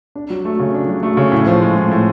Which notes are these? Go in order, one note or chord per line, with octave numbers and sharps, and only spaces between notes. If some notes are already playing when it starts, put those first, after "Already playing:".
D4
F#3
A3
C#3
D4
F#3
A3
C#3
A2
F3
G#3
A2
A2